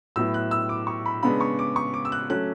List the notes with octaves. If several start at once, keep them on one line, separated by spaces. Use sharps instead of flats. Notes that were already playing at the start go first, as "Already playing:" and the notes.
A2 F#3 B3 E4 E6
F#6
E6
D6
C#6
B5
C#3 G#3 B3 D4 B5
C#6
D6
C#6
D6
E6
F#6
F#3 A3 C#4 F#6